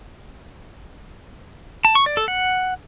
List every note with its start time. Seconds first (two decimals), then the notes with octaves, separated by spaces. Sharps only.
1.85 A5
1.95 C#6
2.06 D5
2.17 A4
2.28 F#5